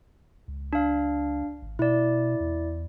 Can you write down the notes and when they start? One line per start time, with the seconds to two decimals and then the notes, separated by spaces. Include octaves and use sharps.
0.48 C#2
0.73 D4 F5
1.62 G#1
1.79 B2 E4 D5
2.40 E2